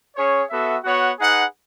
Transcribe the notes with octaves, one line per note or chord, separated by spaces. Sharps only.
C#4 G#4 C#5
B3 F#4 A4 E5
B3 F#4 C#5 F#5
D#4 G#4 B4 F#5